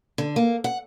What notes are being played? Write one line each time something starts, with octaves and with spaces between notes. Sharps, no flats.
D3
A#3
F#5